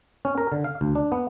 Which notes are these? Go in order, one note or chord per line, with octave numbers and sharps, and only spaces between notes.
C#4
A#4
D3
F5
D2
D4
B3